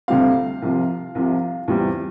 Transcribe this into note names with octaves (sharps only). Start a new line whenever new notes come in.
D2 C3 G3 C4 F5
C2 C3 F3
C2 C3 F3
E2 C3 G3 C4